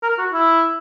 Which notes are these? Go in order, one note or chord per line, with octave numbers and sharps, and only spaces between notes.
A#4
F#4
E4